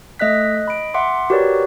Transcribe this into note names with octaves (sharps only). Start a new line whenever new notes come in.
A3 D#5 E5 F#6 B6
F#6
D#5
B5 D7
E5 F#5 C6 D6
F#4 G4 A#4 B4 C#5 D5